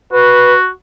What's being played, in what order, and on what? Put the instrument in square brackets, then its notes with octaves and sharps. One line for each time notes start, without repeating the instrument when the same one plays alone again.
[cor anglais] F#4 [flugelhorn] B4